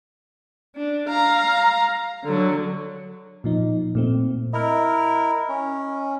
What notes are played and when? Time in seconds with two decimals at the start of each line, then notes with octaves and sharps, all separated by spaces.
0.76 D4
1.09 F5 A#5
2.25 D3 F#3
3.44 A#2 F3 D#4
3.95 A#2 A3 C4
4.53 E4 A#4 D#5 F6
5.49 C#4